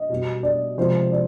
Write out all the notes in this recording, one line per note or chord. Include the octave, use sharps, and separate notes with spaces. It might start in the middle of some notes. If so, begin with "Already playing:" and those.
Already playing: D#5
B2 G3 B3
D5
C3 F3 G#3 C5
D5